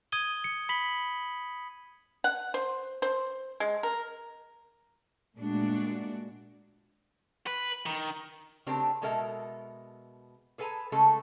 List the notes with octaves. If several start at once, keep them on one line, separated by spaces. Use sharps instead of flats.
D#6 G#6 D#7 G7
C#7
B5 B6 F#7 G7
F#5
C5
C5
G#3
A#4
A#2 G#3 A3 D4 F#4
B4
D#3
C#3 A3 C4 D4 G4 A#4
B2 G#3 A4 A#4 E5
G#4 A4 B4 G#5 A#5
C#3 G#3 A3 A4